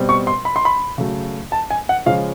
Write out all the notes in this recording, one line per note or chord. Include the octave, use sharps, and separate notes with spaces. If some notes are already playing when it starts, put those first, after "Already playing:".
Already playing: B2 G3 C4
C#6
C6
B5
C6
B5
C#3 F#3 A3
A5
G#5
F#5
C#3 F3 G#3 C#4 F5